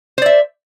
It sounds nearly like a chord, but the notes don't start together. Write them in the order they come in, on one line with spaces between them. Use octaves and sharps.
C5 D5 E5